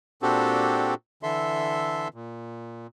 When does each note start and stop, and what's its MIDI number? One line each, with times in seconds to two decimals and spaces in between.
0.22 0.94 46
0.22 0.94 60
0.22 0.94 62
0.22 0.94 66
0.22 0.94 67
0.22 0.94 69
1.23 2.08 50
1.23 2.08 52
1.23 2.08 69
1.23 2.08 76
1.23 2.08 84
2.14 2.87 46